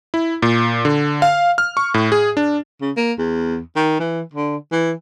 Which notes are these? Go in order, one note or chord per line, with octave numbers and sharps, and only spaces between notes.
E4
A#2
D3
F5
F6
C#6
A2
G#4
D4
C#3
A#3
E2
D#3
E3
D3
E3